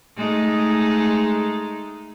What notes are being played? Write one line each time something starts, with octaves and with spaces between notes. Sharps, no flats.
G#3 A3 D#4